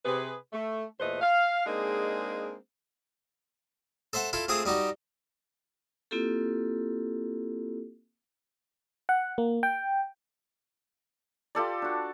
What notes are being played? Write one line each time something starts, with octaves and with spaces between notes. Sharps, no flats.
C3 G#4 B4
A3
E2 A#2 A3 B4 C5 D#5
F5
G#3 A#3 C4 D4 D#4 G#4
A4 C5 E5 F#5
E4 F4 A4
A3 C4 F4 G#4 D#6
G3 D#4 F#4 G4
A#3 C4 E4 F4 G4 A4
F#5
A#3
G5
F4 G4 A4 D5
D4 F#4